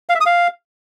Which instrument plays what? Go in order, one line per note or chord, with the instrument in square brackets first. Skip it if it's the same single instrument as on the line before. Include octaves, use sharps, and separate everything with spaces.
[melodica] F5
E5
D#6
F5